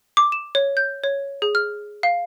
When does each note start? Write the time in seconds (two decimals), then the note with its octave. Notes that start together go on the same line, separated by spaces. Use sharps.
0.17 D6
0.32 E7
0.55 C#5
0.77 G6
1.04 C#5
1.42 G#4
1.55 F6
2.03 F5